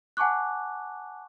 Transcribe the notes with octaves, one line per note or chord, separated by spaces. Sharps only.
F#5 G#5 A5 C#6 D6 F#6